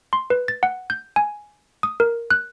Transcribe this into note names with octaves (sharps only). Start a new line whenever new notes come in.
C6
B4
A6
F#5
G6
G#5
D#6
A#4
F#6